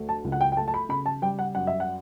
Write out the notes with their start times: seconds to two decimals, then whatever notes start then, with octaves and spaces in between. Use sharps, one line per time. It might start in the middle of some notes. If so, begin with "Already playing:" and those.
Already playing: D2 A3
0.09 A5
0.24 C#2
0.32 F#5
0.41 G5
0.52 G5
0.57 A3 A5
0.68 A5
0.74 B5
0.89 C#3 B5
1.06 A5
1.22 G3 G5
1.39 F#5
1.55 F#2 F#5
1.67 E5
1.80 F#5